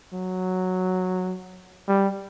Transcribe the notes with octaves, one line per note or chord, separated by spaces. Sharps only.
F#3
G3